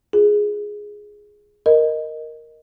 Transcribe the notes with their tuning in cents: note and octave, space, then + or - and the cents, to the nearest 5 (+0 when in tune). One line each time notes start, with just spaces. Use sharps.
F4 +0 G#4 +0
A#4 +0 D#5 +0